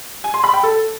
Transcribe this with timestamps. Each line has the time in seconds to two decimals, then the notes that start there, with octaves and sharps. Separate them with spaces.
0.24 G#5
0.34 C6
0.44 B5
0.54 G5
0.63 A4